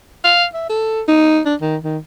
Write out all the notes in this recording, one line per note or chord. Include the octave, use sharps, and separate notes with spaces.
F5
E5
A4
D#4
D4
D#3
D#3